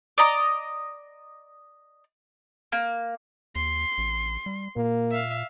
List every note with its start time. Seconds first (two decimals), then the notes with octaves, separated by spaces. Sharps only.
0.18 D5 D#5 A#5 D6
2.72 A#3
3.56 D#2 C6
3.98 A1
4.46 G3
4.76 A#2 A#3
5.12 E5 F5